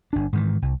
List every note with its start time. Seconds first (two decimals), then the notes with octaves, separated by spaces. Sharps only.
0.13 G1 D4
0.33 G#2 D#3 E3
0.62 C2